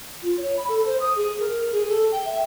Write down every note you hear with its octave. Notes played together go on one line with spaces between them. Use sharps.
F4
C#5
B5
A4
C5
D#6
G#4
A#4
G#4
A4
G5
E5